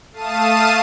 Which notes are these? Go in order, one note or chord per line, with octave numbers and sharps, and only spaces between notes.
A3 F5 A5 D#6 D#7